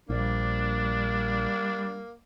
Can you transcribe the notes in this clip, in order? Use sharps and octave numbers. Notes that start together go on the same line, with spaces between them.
A#1 G3 A#3 D4